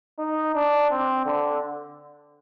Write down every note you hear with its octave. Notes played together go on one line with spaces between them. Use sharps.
D#4
D4
C4
D3